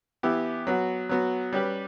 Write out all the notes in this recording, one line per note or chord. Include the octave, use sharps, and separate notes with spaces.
E3 B3 E4 G4
F#3 B3 F#4
F#3 B3 F#4
G3 C#4 G4 B4